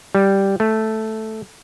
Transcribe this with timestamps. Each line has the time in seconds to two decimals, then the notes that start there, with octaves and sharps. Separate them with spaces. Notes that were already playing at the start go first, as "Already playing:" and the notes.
0.15 G3
0.60 A3